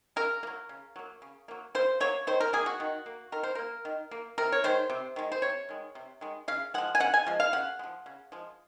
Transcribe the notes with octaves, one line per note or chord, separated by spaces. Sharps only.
C#3 A#4
A#3
F#3
C#3
F#3 A#3
C#3
F#3 A#3
C#3 C5
F#3 A#3 C#5
D#3 C5
A#4
A#3 G#4
F#4
D#3
A#3
D#3 A#4
C5
A#3 A#4
D#3
A#3
C3 A#4
C#5
D#3 G#3 C5
C3
D#3 G#3
C5
C3 C#5
D#3 G#3
C3
D#3 G#3
C#3 F5
F3 G#3 F#5
G#5
C#3 F#5
G#5
F3 G#3
F5
C#3 F#5
G#3
F3
C#3
F3 G#3